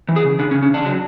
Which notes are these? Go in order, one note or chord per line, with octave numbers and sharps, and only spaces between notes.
E3
G#4
C#3
C#3 D4
C#4
C#3
C#4
C#3 D4
F#3